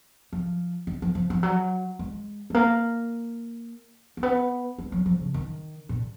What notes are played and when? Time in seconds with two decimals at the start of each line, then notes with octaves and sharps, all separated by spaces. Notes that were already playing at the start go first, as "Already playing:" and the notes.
0.33 F3
0.87 D#3
1.02 F3
1.15 F3
1.30 F3
1.43 F#3
1.99 G#3
2.50 G#3
2.54 A#3
4.17 A#3
4.23 B3
4.79 G#3
4.92 F#3
5.06 F3
5.20 C#3
5.34 D#3
5.89 A#2